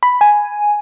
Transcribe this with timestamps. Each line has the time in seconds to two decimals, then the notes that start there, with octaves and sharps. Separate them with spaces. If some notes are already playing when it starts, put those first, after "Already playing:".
0.03 B5
0.21 G#5